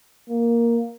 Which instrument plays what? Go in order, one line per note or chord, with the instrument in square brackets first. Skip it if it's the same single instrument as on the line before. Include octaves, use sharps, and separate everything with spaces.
[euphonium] A#3